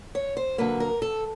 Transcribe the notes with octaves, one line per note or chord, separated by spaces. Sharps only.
C#5
C5
D3 F#3 A#3 B4
A#4
A4